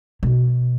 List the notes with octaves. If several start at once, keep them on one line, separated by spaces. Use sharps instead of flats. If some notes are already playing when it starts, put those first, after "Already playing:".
B2